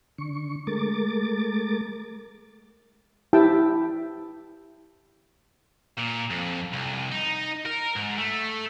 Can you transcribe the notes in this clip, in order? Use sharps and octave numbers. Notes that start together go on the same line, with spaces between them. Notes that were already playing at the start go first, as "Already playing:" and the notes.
D3 C#6
G#3 A3 A#4 D6 A6
E4 G4 G5 A5
A#2
F2
C2
D#4
A#4
G#2
A3